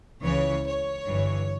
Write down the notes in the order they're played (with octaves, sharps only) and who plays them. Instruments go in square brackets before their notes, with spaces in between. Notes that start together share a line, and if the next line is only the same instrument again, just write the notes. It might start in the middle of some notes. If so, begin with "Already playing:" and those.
[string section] C#2 C#3 E3 C#5
C#5
G1 G2 E3